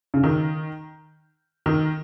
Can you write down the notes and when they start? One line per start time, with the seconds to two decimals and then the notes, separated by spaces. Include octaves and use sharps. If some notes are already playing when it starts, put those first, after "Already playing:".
0.14 C#3
0.23 D#3
1.66 D#3